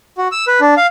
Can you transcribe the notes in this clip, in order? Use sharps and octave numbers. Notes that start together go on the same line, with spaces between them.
F#4
E6
B4
D4
F5